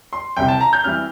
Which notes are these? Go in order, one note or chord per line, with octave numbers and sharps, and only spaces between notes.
C6
C2 C3 G3 C4 G5
A5
A#5
G6
E3 G3 C4 F6